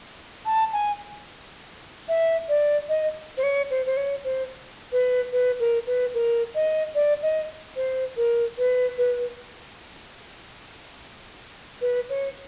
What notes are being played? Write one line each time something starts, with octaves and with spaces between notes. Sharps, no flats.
A5
G#5
E5
D5
D#5
C5
C#5
C5
C5
C#5
C5
B4
B4
A#4
B4
A#4
D#5
D5
D#5
C5
A#4
B4
B4
B4
C#5